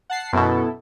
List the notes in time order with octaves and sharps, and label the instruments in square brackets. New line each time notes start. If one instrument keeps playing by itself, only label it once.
[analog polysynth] F#5 A5 C7
[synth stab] F#2 B2 [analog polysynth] B3 E4 A4